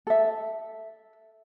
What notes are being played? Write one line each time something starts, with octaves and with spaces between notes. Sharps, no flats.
A4 E5